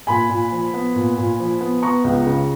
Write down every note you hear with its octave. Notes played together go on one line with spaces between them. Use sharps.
A#2 G#5 B5
A#2
F3
B3
A#2
A#2
F3
B3
B3 A#5 C#6
C#2
C#3